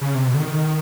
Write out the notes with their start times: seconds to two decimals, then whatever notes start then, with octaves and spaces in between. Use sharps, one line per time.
0.01 C#3
0.15 C3
0.27 B2
0.34 D3
0.40 D#3